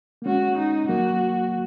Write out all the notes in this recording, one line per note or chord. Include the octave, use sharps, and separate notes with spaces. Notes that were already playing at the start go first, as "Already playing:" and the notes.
A#3
G#3 C#4 F#4
D#4
F#3 A#3 F#4